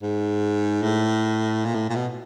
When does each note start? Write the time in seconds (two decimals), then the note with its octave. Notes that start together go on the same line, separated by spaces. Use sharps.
0.02 G#2
0.83 A2
1.65 A#2
1.75 A2
1.90 A#2
1.95 B2